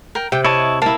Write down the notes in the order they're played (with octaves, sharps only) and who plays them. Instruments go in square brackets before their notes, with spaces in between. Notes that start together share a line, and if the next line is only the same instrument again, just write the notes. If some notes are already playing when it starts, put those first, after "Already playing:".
[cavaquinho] A#4 G5
[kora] C3 [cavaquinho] G5
[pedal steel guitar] E4 C#5 A5 [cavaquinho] D#5
[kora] A#3 E4 [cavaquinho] A5